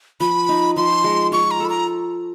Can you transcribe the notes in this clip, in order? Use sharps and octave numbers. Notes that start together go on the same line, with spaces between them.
F3 B5
D#4
F3 C6
G#3
F4 C#6
A#5
A4
B5
A#5